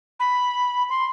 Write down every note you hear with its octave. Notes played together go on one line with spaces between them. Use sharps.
B5
C6